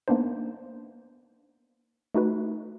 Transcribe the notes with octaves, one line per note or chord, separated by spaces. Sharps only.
A#3 B3 D4 D#4 C5
A3 D#4 F#4 B4